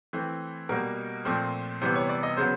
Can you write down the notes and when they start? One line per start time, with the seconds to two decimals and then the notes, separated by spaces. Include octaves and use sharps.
0.13 E3 A3 C4
0.69 B2 G3 A#3 A#4
1.25 A#2 F3 A3 C4
1.82 C3 E3 G3 B3 C5
1.95 C#5
2.09 D5
2.23 D#5
2.37 C#3 F#3 B3 C5